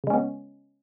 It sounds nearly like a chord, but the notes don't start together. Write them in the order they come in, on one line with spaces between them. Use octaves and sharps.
C#3 G#3 C#4 B3